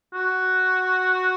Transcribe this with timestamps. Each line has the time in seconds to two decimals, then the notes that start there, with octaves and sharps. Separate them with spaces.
0.14 F#4